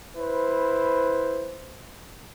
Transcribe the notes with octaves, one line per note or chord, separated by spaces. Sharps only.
E4 B4 C5